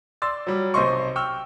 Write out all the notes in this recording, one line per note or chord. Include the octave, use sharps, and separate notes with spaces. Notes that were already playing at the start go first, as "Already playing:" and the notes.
D5 C6 E6 A6
F#3 G3
B1 C3 C5 D#5 C6 C#6
G5 C#6 E6 F6